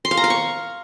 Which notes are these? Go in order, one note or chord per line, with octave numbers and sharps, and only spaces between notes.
C6
F5
A#5
F5
C#6